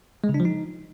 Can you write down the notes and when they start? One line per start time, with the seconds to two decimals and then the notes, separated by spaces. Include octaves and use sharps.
0.24 G#3
0.29 C#3
0.34 D4
0.40 F3
0.45 D#4